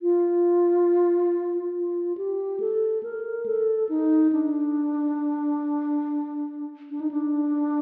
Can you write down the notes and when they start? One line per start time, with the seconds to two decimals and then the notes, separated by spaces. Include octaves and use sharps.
0.02 F4
1.74 F4
2.18 G4
2.60 A4
3.03 A#4
3.46 A4
3.89 D#4
4.32 D4
6.91 D4
7.01 D#4
7.11 D4